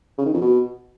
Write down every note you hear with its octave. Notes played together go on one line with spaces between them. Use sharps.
C#3
D#3
F2
B2